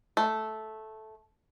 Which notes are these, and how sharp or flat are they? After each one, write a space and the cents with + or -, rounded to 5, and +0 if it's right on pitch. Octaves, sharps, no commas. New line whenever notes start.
A3 -10